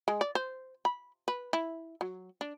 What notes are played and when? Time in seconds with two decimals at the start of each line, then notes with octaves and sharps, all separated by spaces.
0.08 G#3
0.21 D5
0.35 C5
0.85 B5
1.28 B4
1.53 E4
2.01 F#3
2.41 D4